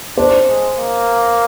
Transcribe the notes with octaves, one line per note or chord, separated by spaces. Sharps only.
D4 C5
G#3
A#3